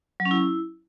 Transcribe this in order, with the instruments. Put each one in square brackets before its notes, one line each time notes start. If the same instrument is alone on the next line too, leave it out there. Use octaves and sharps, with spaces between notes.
[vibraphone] F#3
C#4
E4